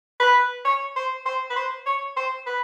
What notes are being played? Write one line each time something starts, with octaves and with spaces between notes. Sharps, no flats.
B4
C#5
C5
C5
B4
C5
C#5
C5
B4